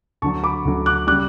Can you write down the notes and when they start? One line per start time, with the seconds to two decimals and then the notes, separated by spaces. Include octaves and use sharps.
0.22 D2 D3 F#3 A5 C#6
0.44 B5 D6
0.65 D2 D3 F#3
0.86 D6 F#6
1.07 C#3 G3 D6 F#6